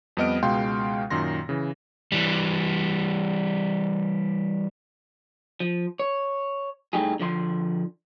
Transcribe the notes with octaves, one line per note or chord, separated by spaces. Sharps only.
F2 G3 B3 D#5 F6 D7
C#2 B2 G#3 F5 G5 C6
F#2 A#2 D#3 C6 A#6
C#3 E3
E3 G3
F3
C#5
A2 G3 A3 D#4 G4 G#4
D3 F3 D5 C6